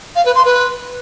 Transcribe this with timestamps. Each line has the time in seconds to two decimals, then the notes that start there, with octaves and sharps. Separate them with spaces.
0.16 F5
0.26 B4
0.35 C6
0.45 B4